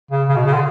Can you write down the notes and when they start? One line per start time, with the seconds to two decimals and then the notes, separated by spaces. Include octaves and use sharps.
0.11 C#3
0.28 C#3
0.36 B2
0.46 C#3
0.53 D3